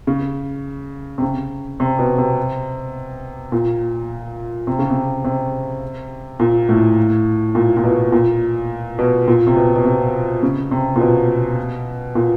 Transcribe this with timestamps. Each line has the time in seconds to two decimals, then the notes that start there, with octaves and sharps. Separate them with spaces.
0.07 C#3
1.18 C3
1.22 C#3
1.80 C3
1.99 B2
2.18 C3
3.52 A#2
4.67 C3
4.79 C#3
4.90 C3
5.24 C3
6.40 A#2
6.69 A2
7.55 A#2
7.77 A#2
7.84 B2
8.12 A#2
8.99 B2
9.28 A#2
9.47 C3
9.56 B2
9.76 B2
9.85 C3
10.43 C#3
10.71 C3
10.96 A#2
11.00 B2
12.15 A#2